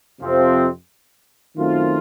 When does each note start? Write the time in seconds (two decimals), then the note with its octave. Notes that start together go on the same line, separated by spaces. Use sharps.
0.21 F2 C3 F3 C4
1.57 F#2 D#3 A3 C4 F4